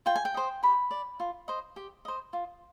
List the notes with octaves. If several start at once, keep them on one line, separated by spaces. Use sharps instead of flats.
F4 G5
G#5
G5
C5 D#5
G4 B5
D5
F4
C5 D#5
G4
C5 D#5
F4